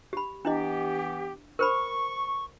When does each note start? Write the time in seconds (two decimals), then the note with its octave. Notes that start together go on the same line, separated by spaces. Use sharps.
0.13 G4 B5
0.45 E3 B3 D4 E4 G4 D#5
1.59 A#4 C5 B5 C#6